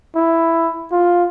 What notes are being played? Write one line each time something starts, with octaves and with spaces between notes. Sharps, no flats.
E4
F4